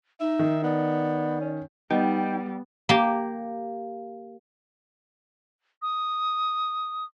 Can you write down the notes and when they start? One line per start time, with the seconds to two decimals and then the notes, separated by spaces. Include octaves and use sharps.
0.20 D#4 E5
0.39 D#3
0.64 B3 D5
1.41 C#4
1.90 G3 B3 D#4 G5
2.89 A#3 G4
5.82 D#6